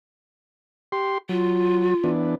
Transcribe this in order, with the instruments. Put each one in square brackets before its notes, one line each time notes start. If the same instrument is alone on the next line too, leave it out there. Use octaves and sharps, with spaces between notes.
[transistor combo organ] G4 C6
[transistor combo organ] F#3 [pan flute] F4
[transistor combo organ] E3 B3 D4